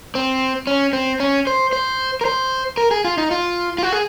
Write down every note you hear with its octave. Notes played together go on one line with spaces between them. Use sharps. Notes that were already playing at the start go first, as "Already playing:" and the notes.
C4
C#4
C4
C#4
C5
C5
A#4
C5
A#4
G#4
F4
D#4
F4
F4
F#4
G#4